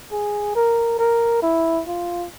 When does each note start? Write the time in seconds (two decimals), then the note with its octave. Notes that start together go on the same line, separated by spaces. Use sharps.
0.12 G#4
0.56 A#4
0.99 A#4
1.43 E4
1.88 F4